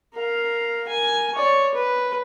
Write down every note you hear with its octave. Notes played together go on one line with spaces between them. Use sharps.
A#4 F5
A#4 G#5
C#5 D5
B4